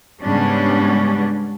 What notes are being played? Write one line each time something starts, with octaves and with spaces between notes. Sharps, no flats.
G#2 C#3 G3 B3 C#4 D4